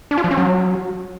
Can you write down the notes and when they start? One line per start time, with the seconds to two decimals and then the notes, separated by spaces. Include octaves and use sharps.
0.11 D4
0.18 F4
0.24 F3
0.31 C#4
0.37 F#3